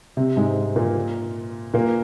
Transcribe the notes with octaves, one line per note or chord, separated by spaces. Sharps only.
C3 C4
G#2 G#3
A#2 A#3
A#2 A#3